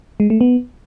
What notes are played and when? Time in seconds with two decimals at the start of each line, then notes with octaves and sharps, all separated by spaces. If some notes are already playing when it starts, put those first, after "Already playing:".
0.20 G#3
0.30 A3
0.41 B3